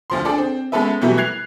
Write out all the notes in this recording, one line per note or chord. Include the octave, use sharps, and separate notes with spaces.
D2 F3 C6
D4 G#4 A4 D5
C4
G#3 B3 C#4 A4 B4 E5
B2 E3 F#3 G3 A3
F#6 G#6 C7 F7